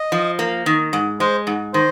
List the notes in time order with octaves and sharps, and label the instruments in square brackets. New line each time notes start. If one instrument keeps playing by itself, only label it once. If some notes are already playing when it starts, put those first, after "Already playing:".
Already playing: [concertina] D#5
[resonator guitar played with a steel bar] F3
A#3
D#3
G#2
[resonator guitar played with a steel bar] G#3 [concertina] C5
[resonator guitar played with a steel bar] G#2
[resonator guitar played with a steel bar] D#3 [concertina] C5